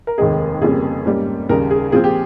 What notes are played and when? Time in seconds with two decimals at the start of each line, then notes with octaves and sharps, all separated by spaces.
0.07 A#4
0.18 F1 D#2 D#3 G#3 D#4 G#4
0.62 F1 F2 C#3 G3 A#3 G#4
1.06 G#2 G3 A#3 C#4
1.49 D#2 C#3 G3 A#4
1.71 G#4
1.92 A#2 F3 C4 F4 G#4
2.04 G4